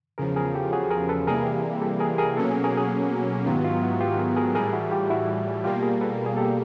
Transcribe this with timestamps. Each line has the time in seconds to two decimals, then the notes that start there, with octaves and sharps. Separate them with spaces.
0.18 E2 C#3 F3 G#4 A#4
0.36 G#4 A#4
0.54 G4 A4
0.73 F#4 G#4
0.91 G#4 A#4
1.09 A4 B4
1.27 C3 E3 G3 A#3 G#4 A#4
1.82 G4 A4
2.00 G#4 A#4
2.18 G#4 A#4
2.37 B2 F#3 A#3 C#4 A4 B4
2.50 G#4 A#4
2.64 G#4 A#4
2.77 F#4 G#4
3.46 G#2 D#3 F#3 B3 F4 G4
3.64 D#4 F4
3.82 E4 F#4
4.00 F4 G4
4.19 G#4 A#4
4.37 G#4 A#4
4.55 A2 E3 G3 G#4 A#4
4.73 E4 F#4
4.91 F4 G4
5.10 E4 F#4
5.64 B2 G3 A#3 F4 G4
5.83 G#4 A#4
6.01 A4 B4
6.26 G#4
6.37 G4 A4